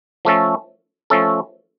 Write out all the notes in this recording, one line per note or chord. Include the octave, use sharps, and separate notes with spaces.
F3 A3 C#4 A4
F3 A3 C#4 A4